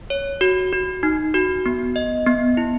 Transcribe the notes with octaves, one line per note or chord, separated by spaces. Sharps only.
C#5
F#4
F#4
D#4
F#4
B3
D#5
B3
E4